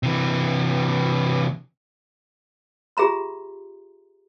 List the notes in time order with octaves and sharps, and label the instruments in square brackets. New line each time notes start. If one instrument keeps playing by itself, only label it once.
[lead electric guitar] C3 E3
[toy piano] F4 G4 G#4 E5 A#5 C6